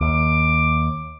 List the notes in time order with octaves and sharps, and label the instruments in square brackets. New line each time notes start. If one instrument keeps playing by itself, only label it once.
[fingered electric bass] D#2 [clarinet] D6